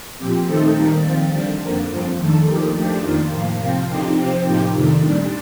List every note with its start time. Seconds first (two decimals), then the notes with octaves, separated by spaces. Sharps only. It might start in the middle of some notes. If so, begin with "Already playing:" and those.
0.17 A#2 F3 C4 G4
0.46 D#3 A3 C4 D#4 A4
0.75 D#3 G3 A#3
1.02 F3 C4 F4
1.31 D3 G3 D4
1.59 F2 D3 F3 A#3
1.88 G2 F3 C4
2.17 F2 D#3 A3 D4 A4
2.45 F3 A#3 D#4 G4
2.74 F3 A3 D4 G4
3.01 F2 D#3 A#3 F4
3.30 A2 F3 A#3
3.59 C3 F3 C4 F4
3.87 D3 F3 C4 D#4 G4
4.16 C3 F3 C4 G4
4.44 A2 F3 A#3 D#4 G4
4.72 F2 C3 D#3 A3 D4
5.01 A#2 G3 D4